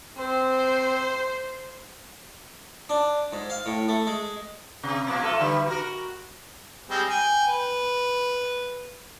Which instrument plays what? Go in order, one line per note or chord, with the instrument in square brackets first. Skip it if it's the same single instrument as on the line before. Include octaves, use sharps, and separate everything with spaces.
[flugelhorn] C4 [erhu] C5
[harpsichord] D4
G#2
F5
A2
A3
G#3
[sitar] C3
B2 F3 A#3
A3 F4 A4
D3 E3 G3
F#4 A#4
[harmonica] G3 G#3 C4
G5 G#5
B4